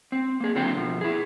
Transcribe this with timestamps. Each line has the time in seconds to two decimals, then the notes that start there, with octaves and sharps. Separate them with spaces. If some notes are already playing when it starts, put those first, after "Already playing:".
0.12 C4
0.40 A#3 G#4
0.55 D3 F#3 C4 C5 G5
0.77 B2 F3
1.01 E4 G#4